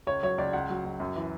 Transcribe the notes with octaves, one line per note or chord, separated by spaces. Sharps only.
C#2 C#5
F#3 C#5
C#2 D5
C#2 F#5
F#3
C#2
F#2
E3